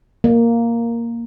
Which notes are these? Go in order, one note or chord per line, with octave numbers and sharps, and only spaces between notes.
A#3